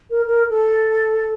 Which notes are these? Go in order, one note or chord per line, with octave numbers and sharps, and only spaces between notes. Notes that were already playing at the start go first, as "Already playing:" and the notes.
A#4
A#4
A4